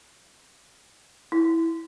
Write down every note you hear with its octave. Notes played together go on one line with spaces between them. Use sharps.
E4